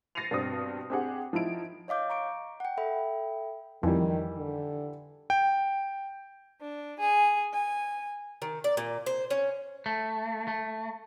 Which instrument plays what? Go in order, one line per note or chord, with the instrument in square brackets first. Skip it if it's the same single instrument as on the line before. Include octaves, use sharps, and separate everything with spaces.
[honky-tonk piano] A6 A#6 C7 C#7 D#7 F7
G2 B2 C4 D#6
C4 D4 G4 G#4 F#5
F3 D#4 E4 D7
[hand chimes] C#5 D#5 F5 D6 G6
A#5 C#6 D7
F#5 G5
A4 E5 G5 B5
[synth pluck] F2 [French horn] D#3 [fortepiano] E3 G3
[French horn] D3
[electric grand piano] G5
[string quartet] D4
G#4
G#5
[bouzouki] D#3
D5
A#2
C5
C#4
[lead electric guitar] A3
A3